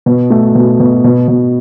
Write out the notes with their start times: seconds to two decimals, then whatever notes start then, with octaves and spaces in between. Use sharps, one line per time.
0.06 B2
0.30 A3
0.55 B2
0.80 B2
1.04 B2
1.28 B2